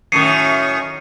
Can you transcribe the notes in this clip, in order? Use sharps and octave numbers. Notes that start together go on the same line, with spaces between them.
F#2 A2 D#3 C7 C#7 D#7